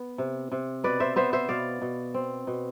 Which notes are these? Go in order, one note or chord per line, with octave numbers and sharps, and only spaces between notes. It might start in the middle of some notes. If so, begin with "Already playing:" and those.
Already playing: B3
C3
C3
B2 B4 D5
C5 E5
B3 C5 E5
C5 E5
B2 D5 F5
B2
C4
B2